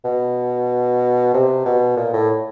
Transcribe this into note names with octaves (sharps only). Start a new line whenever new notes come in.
B2
C3
B2
A#2
A2